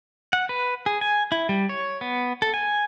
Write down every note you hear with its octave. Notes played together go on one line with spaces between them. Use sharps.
F#5
B4
G#4
G#5
E4
G3
C#5
B3
A4
G#5